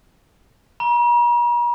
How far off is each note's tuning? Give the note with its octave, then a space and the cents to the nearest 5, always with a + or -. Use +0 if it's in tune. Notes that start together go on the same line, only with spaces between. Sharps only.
A#5 +45